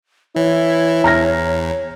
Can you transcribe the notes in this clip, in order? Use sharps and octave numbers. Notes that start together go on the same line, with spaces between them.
E3 E4 C#5
E2 A#5 F6 A#6